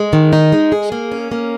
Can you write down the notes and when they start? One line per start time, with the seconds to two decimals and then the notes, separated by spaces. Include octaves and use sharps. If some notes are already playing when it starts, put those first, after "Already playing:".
Already playing: G#3
0.13 D#3
0.33 D#4
0.52 G#3
0.72 G#4
0.92 A#3
1.12 C#4
1.31 A#3